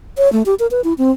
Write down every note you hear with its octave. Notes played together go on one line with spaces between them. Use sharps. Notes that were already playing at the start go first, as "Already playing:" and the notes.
C#5
A3
G4
A#4
B4
E4
C4